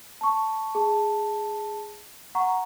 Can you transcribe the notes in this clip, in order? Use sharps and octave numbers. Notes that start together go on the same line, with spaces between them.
A5 C#6
G#4 A5
F#5 A#5 C#6